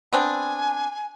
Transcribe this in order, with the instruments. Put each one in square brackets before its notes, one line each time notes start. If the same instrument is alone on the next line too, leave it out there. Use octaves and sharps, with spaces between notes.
[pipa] B3 C4 D4 [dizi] G#5